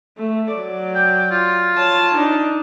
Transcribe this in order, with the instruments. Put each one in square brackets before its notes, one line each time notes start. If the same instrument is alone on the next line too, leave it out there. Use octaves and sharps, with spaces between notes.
[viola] A3
F#3 D5
[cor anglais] G5
F4
[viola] C#5 A5
D4 D#4